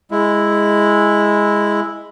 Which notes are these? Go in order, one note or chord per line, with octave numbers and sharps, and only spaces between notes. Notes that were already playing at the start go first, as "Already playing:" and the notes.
G#3 E4